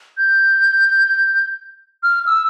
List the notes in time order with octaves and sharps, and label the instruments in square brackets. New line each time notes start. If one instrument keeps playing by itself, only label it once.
[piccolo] G6
F6
E6